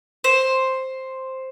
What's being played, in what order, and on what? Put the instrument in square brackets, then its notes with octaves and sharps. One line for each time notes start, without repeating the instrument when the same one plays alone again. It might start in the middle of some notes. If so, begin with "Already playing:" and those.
[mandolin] C5